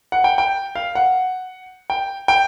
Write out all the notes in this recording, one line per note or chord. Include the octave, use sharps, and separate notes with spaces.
F#5
G5
G5
F5
F#5
G5
G5